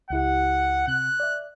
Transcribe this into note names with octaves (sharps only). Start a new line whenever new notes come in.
C#2 E4 G4 F#5
C3 F#6
D5 E5